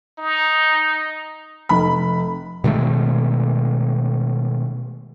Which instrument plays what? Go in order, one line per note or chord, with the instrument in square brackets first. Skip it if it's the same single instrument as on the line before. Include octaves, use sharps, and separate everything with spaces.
[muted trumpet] D#4
[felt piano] F1 B5
[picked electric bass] B2 D#3 G#3 A3